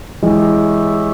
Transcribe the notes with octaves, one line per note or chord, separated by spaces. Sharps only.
E3 G#3 E4 G4 C#5 E5